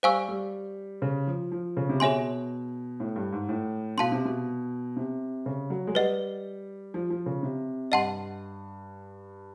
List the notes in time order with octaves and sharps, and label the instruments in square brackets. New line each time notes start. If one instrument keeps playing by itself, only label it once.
[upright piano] G3 [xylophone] C5 F5 G#5 C#6 E6
[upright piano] G3
C#3
F3
F3
C#3
C3
[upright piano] B2 [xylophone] G#4 C#5 E5 G#5 C6
[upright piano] A2
G2
G#2
A2
[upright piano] B2 [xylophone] F5 A5 C6
[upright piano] C3
B2
C3
C#3
F#3
G#3
[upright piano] G3 [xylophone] B4 D#5 F#5
[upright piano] F3
F3
C#3
C3
[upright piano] G2 [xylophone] D#5 F#5 A5 C6